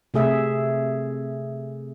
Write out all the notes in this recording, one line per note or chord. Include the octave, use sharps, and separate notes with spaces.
C3 A3 G#4 E5